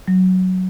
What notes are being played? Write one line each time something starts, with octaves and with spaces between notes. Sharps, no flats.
F#3